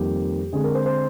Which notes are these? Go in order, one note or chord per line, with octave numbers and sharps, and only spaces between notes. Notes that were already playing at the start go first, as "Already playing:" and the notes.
Already playing: F2 D#3 G3 A#3 G4
D3 G#3 C4 G#4
A#4
C5
C5